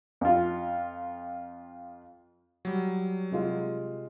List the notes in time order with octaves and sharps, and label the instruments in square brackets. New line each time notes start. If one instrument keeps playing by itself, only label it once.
[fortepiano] F2 F4
[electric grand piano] F#3 G3
[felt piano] C3 G#3 F4